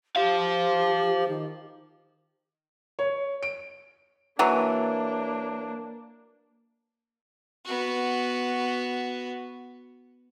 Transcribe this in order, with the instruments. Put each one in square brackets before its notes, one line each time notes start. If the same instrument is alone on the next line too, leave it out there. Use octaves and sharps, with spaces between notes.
[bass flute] G4 [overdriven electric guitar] C5 F5
[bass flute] D#3
[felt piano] C#5
D7
[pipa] E3 F#3 [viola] A#3 D4
[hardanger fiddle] B3 F#4